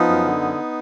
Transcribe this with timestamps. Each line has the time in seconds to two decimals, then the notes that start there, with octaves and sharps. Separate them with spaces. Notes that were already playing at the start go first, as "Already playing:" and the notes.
Already playing: F3 B3 D#4
0.09 F#2
0.25 D3
0.42 F#2